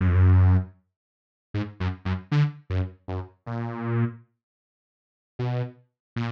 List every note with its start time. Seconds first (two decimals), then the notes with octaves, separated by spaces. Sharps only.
0.01 F#2
0.07 F2
0.15 F#2
1.54 G#2
1.80 F#2
2.05 F#2
2.32 D3
2.70 F#2
3.08 F#2
3.46 A#2
5.39 B2
6.16 A#2